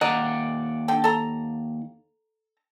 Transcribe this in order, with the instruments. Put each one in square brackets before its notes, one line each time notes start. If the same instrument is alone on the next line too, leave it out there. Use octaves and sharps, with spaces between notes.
[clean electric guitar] D#2 D5 F#5 [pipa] D#5 A#5
[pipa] D3 G5
A4 A#5